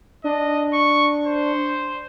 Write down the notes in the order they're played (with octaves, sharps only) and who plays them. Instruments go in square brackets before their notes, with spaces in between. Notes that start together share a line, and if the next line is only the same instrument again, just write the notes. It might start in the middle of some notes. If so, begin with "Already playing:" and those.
[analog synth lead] D4 [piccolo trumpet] D#5
[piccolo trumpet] C#6
C5